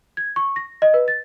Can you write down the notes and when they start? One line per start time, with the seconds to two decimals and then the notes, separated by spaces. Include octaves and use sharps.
0.17 G#6
0.36 C#6
0.56 A#6
0.82 D#5
0.94 B4
1.08 A6